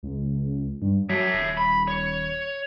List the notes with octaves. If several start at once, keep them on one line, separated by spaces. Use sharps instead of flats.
C#2
G2
F#3 C#5 E5
D#1
B5
C#5